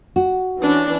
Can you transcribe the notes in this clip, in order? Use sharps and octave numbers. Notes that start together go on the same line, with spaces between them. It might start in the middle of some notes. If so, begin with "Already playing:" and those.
F#4
E3 C#4 D4